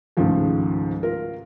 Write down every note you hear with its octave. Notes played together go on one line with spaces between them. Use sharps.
C#2 G#2 D#3 F3 A3
F4 A#4